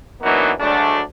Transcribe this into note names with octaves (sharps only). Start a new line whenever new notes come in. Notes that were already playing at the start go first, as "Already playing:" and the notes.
E3 F#3 A#3 B3 D4 D#4
D2 F#3 G#3 A3 D4